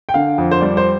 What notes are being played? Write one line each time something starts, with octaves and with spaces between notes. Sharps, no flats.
G5
D3 F5
F2
C5
G3 D5
C5